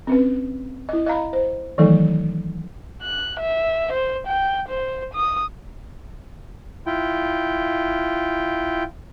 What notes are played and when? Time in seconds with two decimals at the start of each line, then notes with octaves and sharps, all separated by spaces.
0.07 C4 C#4 B4
0.89 E4 D#5
1.06 D#5 F5 A#5 B5
1.33 C5
1.78 D#3 E3 F#3 A3 D#4 A4
3.03 F#6
3.40 E5
3.93 C5
4.27 G5
4.69 C5
5.14 D#6
6.86 E4 F4 G5